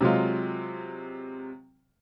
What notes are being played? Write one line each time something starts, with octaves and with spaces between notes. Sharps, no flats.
C3 F#3 G#3 F4